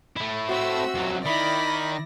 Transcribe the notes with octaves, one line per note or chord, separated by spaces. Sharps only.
A3 E4
C4 F#4 E5 E6
F2 F#3
D#3 E4 D5 B5 A#6